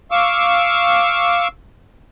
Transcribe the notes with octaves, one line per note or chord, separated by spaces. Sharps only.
F5 C#6 D6 E6